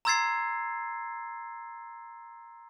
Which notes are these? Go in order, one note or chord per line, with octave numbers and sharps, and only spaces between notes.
A#5 C6 E6 G#6 A6 C7